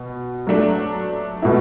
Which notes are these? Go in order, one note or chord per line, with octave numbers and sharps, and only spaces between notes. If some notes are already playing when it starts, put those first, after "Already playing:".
Already playing: B2
F#3 A3 D4
B2 A3 E4